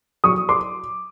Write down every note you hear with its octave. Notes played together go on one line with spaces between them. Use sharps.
F#3 C#6 D#6
C6 D6